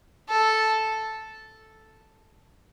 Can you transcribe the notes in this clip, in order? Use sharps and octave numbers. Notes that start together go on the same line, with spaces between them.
A4